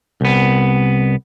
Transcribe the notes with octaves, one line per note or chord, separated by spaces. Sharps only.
C2 B3